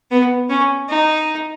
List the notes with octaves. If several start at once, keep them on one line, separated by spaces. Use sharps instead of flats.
B3
C#4
D#4